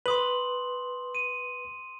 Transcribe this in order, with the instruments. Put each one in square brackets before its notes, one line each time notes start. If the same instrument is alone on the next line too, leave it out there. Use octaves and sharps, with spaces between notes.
[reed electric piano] B4 [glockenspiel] C6 D#6 F#7
[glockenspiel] D#7